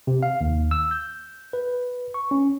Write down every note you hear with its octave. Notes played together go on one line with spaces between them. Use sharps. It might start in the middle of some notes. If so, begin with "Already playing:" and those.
C3
F5
D#2
E6
G6
B4
C#6
C#4